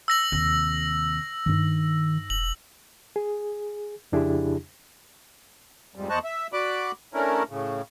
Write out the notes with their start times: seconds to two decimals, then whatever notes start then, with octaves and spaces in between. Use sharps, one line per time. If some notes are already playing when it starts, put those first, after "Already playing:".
0.08 E6 A#6 F#7
0.32 D#2 C3
1.46 G2 D#3 D#4
2.30 E1 F#7
3.16 G#4
4.12 F2 C#3 D4 E4 G4 G#4
5.95 F2 G#2 G3
6.10 E2 C5 D#5 A5 C#6 F#6
6.24 E5
6.53 F#4 D5 B5 D6 F#6
7.14 A3 C#4 D4 E4 A#4
7.50 A2 C#3